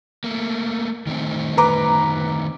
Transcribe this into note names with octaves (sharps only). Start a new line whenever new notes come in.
A3 A#3
D#3 A3 C4
B4 A#5 D6